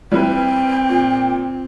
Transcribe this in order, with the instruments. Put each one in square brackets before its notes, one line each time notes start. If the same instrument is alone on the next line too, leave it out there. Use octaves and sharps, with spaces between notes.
[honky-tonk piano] G3 E4 B4 [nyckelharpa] C4 [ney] G5
[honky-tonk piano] A#2